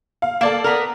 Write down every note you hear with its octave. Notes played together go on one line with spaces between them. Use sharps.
F5
A#3 A4 D5 F5
B3 A#4